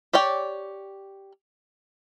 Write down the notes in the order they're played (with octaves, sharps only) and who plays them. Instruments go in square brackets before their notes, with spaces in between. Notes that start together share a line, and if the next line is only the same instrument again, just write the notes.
[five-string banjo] G4 C#5 D5 G5